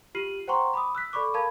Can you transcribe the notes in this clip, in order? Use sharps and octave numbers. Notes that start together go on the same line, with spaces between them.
F4 G4 F6 C7 D#7 F#7
C5 F#5 G5 A#5 C6 C#6
B5 D6 D#6
E6 F#6 B6
A4 D5 B5 C#6 D6
A#4 F5 A5 B5 G#6